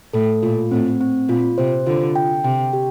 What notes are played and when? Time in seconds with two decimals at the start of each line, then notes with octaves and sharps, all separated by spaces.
0.13 A2 A4
0.43 A#2 F4
0.71 A2 C4
1.01 C4
1.29 A#2 F4
1.58 C3 C5
1.86 D3 F4
2.16 G5
2.44 C3 G5
2.73 G4